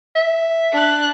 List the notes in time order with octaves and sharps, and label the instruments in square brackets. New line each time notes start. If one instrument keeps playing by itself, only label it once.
[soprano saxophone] E5
[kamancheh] D4 F#6